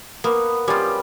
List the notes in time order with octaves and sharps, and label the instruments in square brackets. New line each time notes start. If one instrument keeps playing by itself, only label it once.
[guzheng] A#3 [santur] B3
[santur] G3 [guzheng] C#4 F4